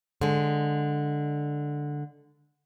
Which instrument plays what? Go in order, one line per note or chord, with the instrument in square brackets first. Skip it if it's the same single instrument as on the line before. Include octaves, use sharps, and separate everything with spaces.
[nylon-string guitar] D3 G#3